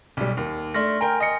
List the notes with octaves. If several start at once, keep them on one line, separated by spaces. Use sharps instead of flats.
B1 G3
D#2
A3 D4 C6 F6 A#6
A#4 G5 G#5
D#5 A#6 C#7